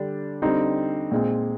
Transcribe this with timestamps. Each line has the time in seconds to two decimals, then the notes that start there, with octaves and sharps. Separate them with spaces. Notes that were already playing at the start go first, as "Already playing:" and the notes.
Already playing: D3 G3 D4
0.42 D3 G3 C4 D#4
1.12 A#2 G#3 C4